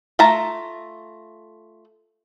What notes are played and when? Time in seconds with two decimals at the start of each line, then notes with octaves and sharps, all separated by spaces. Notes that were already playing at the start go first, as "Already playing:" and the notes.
0.19 A3 F4 A5 A#5